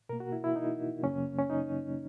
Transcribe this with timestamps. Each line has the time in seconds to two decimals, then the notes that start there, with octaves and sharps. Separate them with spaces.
0.09 B2 A#4
0.13 A#3
0.20 F#4
0.32 E4
0.44 E4
0.56 D#4
1.03 F#2 C#3 F#3 A#3 C#4
1.38 C#4
1.50 D#4